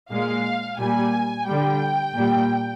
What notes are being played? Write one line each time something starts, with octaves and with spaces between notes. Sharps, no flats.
A#2 G#3 F5
A#2 G3 G#5
D3 G3 G5
A#2 G3